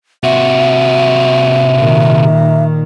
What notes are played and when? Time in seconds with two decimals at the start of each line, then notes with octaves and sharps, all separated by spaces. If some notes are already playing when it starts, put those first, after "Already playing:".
0.24 C3 F#4 E5
1.76 A#2 D#3